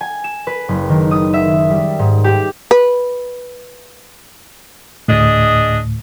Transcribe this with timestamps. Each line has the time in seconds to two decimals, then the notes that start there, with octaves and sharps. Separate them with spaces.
0.01 G#5
0.24 E7
0.47 B4
0.68 F#1
0.89 D#3
1.11 D#6
1.34 E5
1.70 G3
1.99 G#2
2.24 G4
2.71 B4
5.08 D2 A2 D4 G#4 D#5